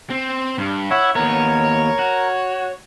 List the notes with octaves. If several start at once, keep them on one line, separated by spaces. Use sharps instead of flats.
C4
G2
E4 C#5 E5 F#5
D#2 B3 A#4 C#5
F#4